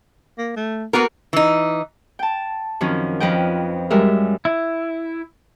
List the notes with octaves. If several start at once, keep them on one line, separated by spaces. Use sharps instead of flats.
A#3
A3
A#3 B3 F#4 A#4
E3 D#4
G5 A5
F#2 D#3 F3 C4 C#4
F2 F3 B4 D#5 G5
F#2 G3 G#3 A#4 E5
E4